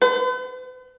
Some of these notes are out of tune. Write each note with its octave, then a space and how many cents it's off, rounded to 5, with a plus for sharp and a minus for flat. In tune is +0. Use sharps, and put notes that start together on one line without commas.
B4 +45